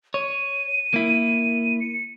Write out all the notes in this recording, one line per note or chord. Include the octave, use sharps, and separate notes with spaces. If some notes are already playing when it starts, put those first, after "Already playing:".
C#5 D#7
A#3 E4
C#7